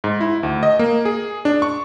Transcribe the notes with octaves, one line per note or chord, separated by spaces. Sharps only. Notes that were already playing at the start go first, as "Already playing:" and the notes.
G#2
E4
D2
D#5
A#3
G#4
D4
C#6